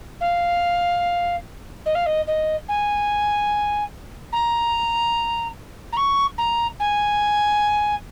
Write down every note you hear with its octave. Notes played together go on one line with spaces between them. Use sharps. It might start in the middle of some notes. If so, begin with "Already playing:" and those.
F5
D#5
F5
D#5
D#5
G#5
A#5
A#5
C#6
A#5
G#5